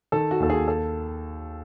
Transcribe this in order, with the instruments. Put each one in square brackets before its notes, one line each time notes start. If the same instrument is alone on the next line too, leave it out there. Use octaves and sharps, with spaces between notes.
[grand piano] D#3 A4
F#4
D#2 A4
G#4
A4